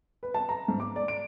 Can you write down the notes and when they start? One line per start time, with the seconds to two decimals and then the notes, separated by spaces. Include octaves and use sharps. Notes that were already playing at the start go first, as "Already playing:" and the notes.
0.23 B4
0.34 A5
0.49 A#5
0.68 G#2
0.80 D6
0.96 D5
1.08 D7